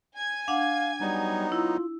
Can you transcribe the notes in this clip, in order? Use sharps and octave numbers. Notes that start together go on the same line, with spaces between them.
G#5 G#6
D4 F5 F#5
F#3 G3 B3 D#4
E4 F4